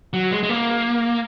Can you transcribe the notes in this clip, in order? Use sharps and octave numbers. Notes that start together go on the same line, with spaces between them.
F#3
G#3
G#3
A#3